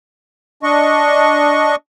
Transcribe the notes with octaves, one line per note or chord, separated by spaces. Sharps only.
D4 D#5 C#6